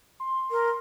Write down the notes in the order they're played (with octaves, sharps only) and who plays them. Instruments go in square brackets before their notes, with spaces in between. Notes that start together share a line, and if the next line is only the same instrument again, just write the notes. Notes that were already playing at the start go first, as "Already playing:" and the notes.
[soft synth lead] C6
[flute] A#4